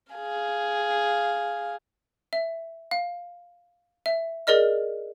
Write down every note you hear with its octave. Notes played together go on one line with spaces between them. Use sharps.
G#4 F5
E5
F5
E5
G#4 A#4 D5 D#5 F6